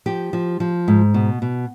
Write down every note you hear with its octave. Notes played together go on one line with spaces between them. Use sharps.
F3 G4
F3
F3
G#2
B2
B2